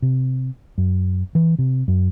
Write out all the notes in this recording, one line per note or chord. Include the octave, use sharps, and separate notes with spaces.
C3
F#2
E3
C3
F#2